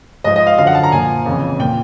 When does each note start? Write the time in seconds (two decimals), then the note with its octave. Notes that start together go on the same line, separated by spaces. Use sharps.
0.24 G#2 F3 D#5
0.36 D#5
0.47 F5
0.58 F#2 D3 F3 F5
0.67 F#5
0.75 A5
0.83 A#5
0.92 A#2 F3 G#5
1.26 F2 C#3 E3
1.59 A#2 F3 G5